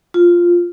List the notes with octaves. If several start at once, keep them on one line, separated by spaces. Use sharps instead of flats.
F4